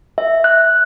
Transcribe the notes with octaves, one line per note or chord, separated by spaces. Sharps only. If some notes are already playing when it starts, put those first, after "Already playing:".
E5
F#6